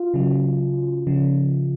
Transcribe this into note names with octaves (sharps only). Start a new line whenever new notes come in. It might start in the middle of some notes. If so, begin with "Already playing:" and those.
Already playing: F4
C#3 F#3
C#3 F3